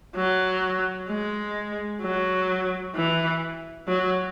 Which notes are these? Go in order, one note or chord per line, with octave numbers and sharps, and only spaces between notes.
F#3
G#3
F#3
E3
F#3